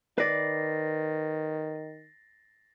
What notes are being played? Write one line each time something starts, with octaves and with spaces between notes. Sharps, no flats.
D#3 B4 D5 A6 A#6 C7